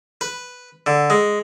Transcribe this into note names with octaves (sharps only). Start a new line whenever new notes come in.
B4
D3
G#3